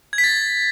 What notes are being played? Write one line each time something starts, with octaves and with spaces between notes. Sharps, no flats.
G#6
B6
A6